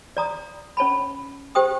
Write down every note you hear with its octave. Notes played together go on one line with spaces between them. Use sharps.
D5 A#5 D#6
C#4 C#5 A5 B5
G4 C5 G5 D#6